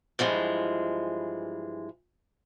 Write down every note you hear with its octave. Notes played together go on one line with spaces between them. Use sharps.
G2 E3 F3 G#3